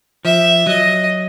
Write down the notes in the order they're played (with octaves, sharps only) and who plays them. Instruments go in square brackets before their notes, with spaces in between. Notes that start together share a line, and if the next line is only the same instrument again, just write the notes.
[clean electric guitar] F3 [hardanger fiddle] E5
[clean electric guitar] F#3 [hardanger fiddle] D#5